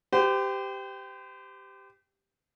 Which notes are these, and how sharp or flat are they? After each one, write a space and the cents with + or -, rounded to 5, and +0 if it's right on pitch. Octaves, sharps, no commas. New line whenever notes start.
G4 +0 C5 -40